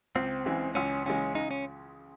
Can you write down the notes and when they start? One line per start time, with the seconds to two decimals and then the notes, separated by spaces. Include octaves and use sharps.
0.15 C#2 C4
0.45 C#3 E3 G#3
0.75 C#2 C#4
1.06 C#3 E3 G#3 C#4
1.35 C#3 D#4
1.51 C#4